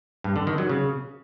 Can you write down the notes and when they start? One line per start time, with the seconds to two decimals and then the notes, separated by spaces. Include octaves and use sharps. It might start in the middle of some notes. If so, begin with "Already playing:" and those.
0.24 G2
0.36 D3
0.47 D#3
0.58 F#3
0.69 C#3